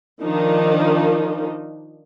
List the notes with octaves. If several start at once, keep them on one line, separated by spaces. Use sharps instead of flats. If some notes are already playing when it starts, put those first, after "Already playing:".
D#3 F3 D4 D#4